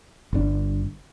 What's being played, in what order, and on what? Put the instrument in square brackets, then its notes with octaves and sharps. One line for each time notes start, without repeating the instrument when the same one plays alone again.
[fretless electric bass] G1 C3 D4